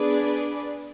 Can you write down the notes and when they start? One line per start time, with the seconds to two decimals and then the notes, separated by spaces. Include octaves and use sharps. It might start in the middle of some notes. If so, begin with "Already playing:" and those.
Already playing: B3 D4 G#4 B4 D5